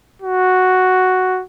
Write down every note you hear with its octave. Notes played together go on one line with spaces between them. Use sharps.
F#4